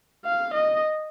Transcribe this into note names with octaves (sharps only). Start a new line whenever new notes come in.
F5
D#5